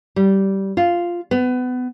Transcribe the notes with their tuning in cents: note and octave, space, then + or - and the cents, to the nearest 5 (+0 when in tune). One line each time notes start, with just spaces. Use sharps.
G3 -15
F4 -5
B3 +25